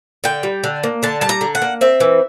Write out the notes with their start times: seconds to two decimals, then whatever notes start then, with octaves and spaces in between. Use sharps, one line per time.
0.24 D3 G5
0.43 G3
0.64 D3
0.83 A#3
1.03 D3 A5
1.21 G3 A5
1.29 A#5
1.41 D3
1.55 F#5
1.62 A#3
1.81 C4 E5
2.00 E3